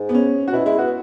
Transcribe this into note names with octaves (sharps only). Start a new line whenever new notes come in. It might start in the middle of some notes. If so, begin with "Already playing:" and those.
Already playing: G#2
B3
C#4
F#4
B2 E4
G#3 E4
B3 F#4